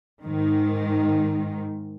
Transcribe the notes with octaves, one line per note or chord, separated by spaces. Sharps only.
G#2 D#3